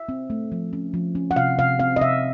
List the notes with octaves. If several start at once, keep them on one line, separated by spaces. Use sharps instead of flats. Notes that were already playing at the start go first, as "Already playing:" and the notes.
Already playing: E5
C4
A3
F3
C#4
F3
C#4
F#5
C3 F5
C3 F5
C4 F5
D#5
C3 E5